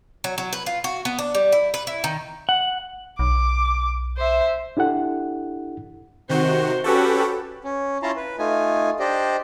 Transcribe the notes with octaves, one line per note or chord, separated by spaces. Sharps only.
F#3
F#3
B4
F4
F#4
B3
D4
G3
E4
B4
E4
D#3
F#5
B1 D6
C5 E5
D4 E4 G4 A4 F#5
C3 D#3 F#4 C5
C#4 F#4 G4 A4 B4
C#4
C#4 E4 F4 A5 A#5 C6
B4
A3 D#4 F4 G#5
D4 G4 C5 D5 D#5